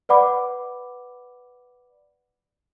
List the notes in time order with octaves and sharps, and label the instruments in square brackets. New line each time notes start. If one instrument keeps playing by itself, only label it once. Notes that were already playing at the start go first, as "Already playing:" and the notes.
[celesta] B4 D5 F#5 B5 D6